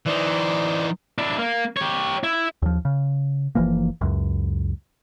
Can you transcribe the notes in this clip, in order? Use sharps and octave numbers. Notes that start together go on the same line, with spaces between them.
E3 D#4 C5 D5
D4 E4
A#3
G4 C#5
E4
D#2 F3
C#3
F#1 E3 F3 A#3
C#2 F#2